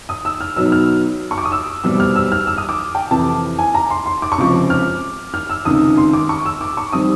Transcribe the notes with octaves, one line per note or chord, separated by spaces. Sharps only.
D#6
E6
F6
B2 F#3 B3 D#4 E6
F6
C#6
D6
D#6
E6
C2 B2 G3 C4 E6
F6
E6
F6
E6
D#6
D6
G5
F2 C3 E3 A5
G#5
A#5
C6
C6
D6
C#6
C#2 C3 F3 D6
F6
F6
E6
C#2 C3 D#3 D#6
C6
D6
C#6
E6
D6
C#6
D#3 G3 C4 D#6